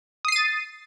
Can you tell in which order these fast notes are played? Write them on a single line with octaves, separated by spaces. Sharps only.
D#6 C7 D#7 A6